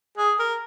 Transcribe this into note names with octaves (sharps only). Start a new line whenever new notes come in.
G#4
A#4